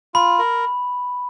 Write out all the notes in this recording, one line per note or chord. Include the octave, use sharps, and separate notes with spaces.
F4 B5
A#4